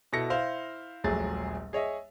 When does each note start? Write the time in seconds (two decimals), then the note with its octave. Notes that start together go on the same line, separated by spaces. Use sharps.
0.13 B2 E4 A4 A#6 C#7
0.30 E4 C5 F5
1.04 D#1 A#1 F#3 A3 G#4 A6
1.73 G#4 C#5 D#5 E5